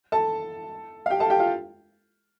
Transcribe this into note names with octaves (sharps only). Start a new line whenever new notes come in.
A4 A5
F5
G4 G5
A4 A5
G4 G5
F4 F5